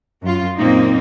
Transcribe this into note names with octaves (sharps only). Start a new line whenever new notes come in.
F#2 F4
F#2 A#2 A#3 C4 D#4